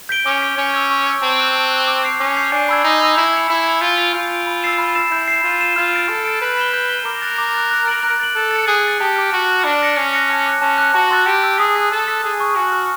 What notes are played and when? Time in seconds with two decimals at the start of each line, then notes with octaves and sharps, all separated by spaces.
0.09 G6 B6 D7 G7
0.26 C#4 D6
0.42 G6 B6 D7 G7
0.58 C#4 C#6
0.74 E6 G#6
0.90 C#6
1.07 E6 G#6
1.22 C4 A5
1.39 D6 F#6
1.55 A5
1.71 D6 F#6
1.88 D6
2.04 G6 C7 F7
2.20 C#4 D6
2.36 G6 C7 F7
2.52 D4 G#5
2.69 B5 E6 G#6
2.84 D#4 G#5
3.01 B5 E6 G#6
3.17 E4 E6
3.33 G#6 C#7 F7
3.49 E4 E6
3.66 G#6 C#7 F7
3.81 F4 G6
3.98 B6 D7
4.14 F4 G6
4.31 B6 D7
4.47 B5
4.63 E6 A6 C7 E7
4.78 B5
4.95 E6 A6 C7 E7
5.11 E4 G6
5.28 C7 E7
5.44 F4 G6
5.60 C7 E7
5.76 F4 F6
5.93 A6 D7
6.09 A4 F6
6.25 A6 D7
6.41 B4 G6
6.57 B6 E7 G7
6.74 G6
6.89 B6 E7 G7
7.05 A#4 D6
7.22 F#6 A6
7.38 D6
7.54 F#6 A6
7.71 F#6
7.87 A6 D7 F#7
8.03 F#6
8.20 A6 D7 F#7
8.35 A4 F#6
8.51 A6 C#7
8.67 G#4 F#6
8.84 A6 C#7
9.00 G4 A5
9.16 D6 F6
9.32 F#4 A5
9.48 D6 F6
9.64 D4 D6
9.81 F#6 A#6 C#7
9.97 C#4 D6
10.13 F#6 A#6 C#7
10.30 A5
10.46 D6 F#6
10.62 C#4 A5
10.78 D6 F#6
10.94 F#4 A5
11.11 C6 E6 A6
11.26 G4 A5
11.43 C6 E6 A6
11.59 G#4 D#6
11.76 F#6 B6
11.92 A4 D#6
12.08 F#6 B6
12.24 G#4 G#5
12.40 C#6 F6
12.56 F#4 G#5
12.72 C#6 F6